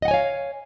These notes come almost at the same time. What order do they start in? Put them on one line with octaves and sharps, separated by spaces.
D#5 F#5 G#5 C#5 F5